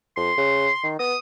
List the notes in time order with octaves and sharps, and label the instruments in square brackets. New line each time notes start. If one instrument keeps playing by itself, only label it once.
[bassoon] F2 [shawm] C6
[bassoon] C#3
D#3
[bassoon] B3 [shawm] D#6